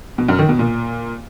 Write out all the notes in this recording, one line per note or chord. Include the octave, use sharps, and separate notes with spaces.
B2
F#2
D#3
B2
A#2